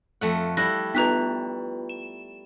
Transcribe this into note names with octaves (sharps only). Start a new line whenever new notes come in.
F2 A3 F#5
G3 E4 F#6 A#6
B3 F4 B4 A#5 F#6 B6
E7